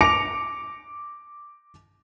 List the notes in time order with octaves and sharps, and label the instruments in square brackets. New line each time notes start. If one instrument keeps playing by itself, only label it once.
[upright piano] D6 A#6 C#7 D7 F7